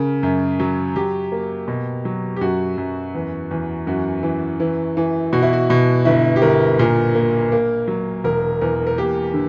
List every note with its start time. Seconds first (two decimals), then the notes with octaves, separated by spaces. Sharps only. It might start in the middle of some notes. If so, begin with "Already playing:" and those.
Already playing: C#3 A#4
0.23 F#2
0.60 F#3
0.96 F#3 G4
1.32 A#3
1.68 B2
2.05 F#3
2.36 G4
2.41 F#2 F#4
2.78 F#2
3.15 E2
3.51 E2
3.87 F#2 F#4
4.23 E3
4.60 E3
4.97 E3
5.33 B2 F#4
5.43 E4
5.53 F#4
5.70 B2
6.05 G1 E4
6.36 G4
6.42 G1 A#4
6.79 A#2 A#4
7.15 A#3
7.52 A#3
7.88 F#3
8.24 E1 A#4
8.61 E2 A#4
8.87 A#4
8.98 A#3 G4
9.33 D3